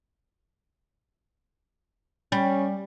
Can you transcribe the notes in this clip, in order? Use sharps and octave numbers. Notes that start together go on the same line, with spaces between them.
G3 C#4